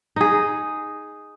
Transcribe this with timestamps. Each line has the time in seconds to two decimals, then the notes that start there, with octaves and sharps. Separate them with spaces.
0.16 D#4 G#4